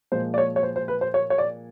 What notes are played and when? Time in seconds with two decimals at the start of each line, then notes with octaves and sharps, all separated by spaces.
0.12 A#2 F3 G#3 C5
0.34 D5
0.38 C#5
0.56 C#5
0.63 C5
0.76 C5
0.88 B4
1.01 C5
1.14 C#5
1.30 C#5
1.38 D5